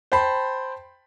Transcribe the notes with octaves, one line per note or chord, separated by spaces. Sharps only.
C5 G5 A5 B5